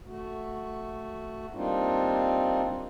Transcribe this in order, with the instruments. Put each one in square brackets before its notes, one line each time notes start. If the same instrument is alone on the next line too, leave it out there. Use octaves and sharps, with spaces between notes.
[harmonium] A3 F#4
G3 A#3 C4 D4 D#4 F4